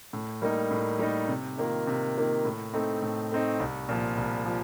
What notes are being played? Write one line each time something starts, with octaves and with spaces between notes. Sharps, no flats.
A2
G3 A#3 D#4
A2
G3 A#3 D#4
C3
D#3 A#3 F4
C3
D#3 A#3 F4
A2
A3 C4 D#4
A2
A3 C4 D#4
C2
A#2 F3
C2
F3